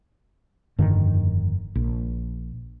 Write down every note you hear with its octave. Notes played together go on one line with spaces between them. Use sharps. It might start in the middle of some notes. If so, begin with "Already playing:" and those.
F1 G2 D3 D#3
A#1